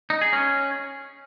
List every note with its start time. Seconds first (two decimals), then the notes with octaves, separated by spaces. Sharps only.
0.10 D#4
0.21 G#4
0.33 C#4